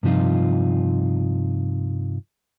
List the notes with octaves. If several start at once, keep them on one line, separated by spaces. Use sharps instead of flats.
G2 C3 F3 D#4 F4